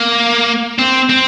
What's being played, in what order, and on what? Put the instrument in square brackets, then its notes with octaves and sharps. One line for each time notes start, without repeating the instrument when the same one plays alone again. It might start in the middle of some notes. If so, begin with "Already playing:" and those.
Already playing: [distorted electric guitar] A#3
C4
C4